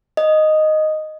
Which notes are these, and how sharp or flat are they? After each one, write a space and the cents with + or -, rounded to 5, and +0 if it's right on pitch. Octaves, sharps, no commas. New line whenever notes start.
D#5 -5